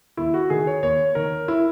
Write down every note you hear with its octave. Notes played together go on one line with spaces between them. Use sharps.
D#2 E4
F#4
D#3 G#4
C#5
D#2 C#5
D#3 A#4
E4